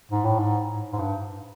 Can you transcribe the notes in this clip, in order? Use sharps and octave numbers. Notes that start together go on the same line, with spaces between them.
G#2
A2
G#2
G#2
G2